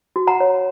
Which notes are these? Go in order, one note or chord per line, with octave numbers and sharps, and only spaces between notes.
F#4
F#5 A#5
C#5